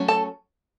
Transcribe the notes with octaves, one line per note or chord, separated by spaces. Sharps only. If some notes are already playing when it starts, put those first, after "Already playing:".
Already playing: F#3 A3 C#4
A4 A5